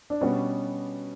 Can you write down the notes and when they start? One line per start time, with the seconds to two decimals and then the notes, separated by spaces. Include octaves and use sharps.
0.10 D4
0.21 B2 G3 B3 C#4 D4 F#4